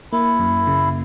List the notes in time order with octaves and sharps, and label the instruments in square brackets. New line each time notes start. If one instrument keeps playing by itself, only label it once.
[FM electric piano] A#3 [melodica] E4
[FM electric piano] F#2
C#3